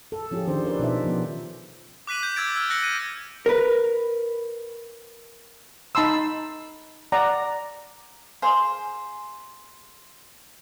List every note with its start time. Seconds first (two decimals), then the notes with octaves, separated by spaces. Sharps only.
0.12 A4
0.31 F3 C#4 F4 G4 G#4
0.47 D#3 D4 G#4 C5
0.63 C#4 A#4 B4 D5
0.79 B2 D#4 C5 E5
1.04 F3 B3
2.07 D6 F#6 B6 D#7 F#7
2.23 G6
2.36 D6 E6 G#6 A6 D7
2.56 E6 F6
2.70 F#6 A#6 C#7 F#7
2.83 D#7
3.46 A#4 B4
5.95 D#4 A5 B5 C6 E6
7.12 D5 F#5 A#5
8.42 G#4 C5 F5